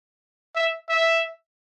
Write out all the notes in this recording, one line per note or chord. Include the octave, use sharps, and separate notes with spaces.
E5
E5